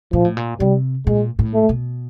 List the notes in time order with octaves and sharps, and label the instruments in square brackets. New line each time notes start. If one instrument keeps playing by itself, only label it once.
[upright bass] A#2 [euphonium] F3
[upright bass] A2
A#2
[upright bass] C3 [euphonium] G3
[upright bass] A#2 [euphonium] G#3
[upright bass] A2
[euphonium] A3
[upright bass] B2